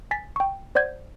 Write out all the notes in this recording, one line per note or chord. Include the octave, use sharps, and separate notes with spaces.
G#5 A6 B6
G5 C#6
C5 D5 F#5 G6 G#6